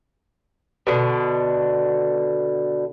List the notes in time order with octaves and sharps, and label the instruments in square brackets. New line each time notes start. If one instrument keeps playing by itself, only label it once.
[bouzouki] B2 D3